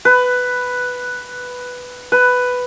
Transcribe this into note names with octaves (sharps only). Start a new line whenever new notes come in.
B4
B4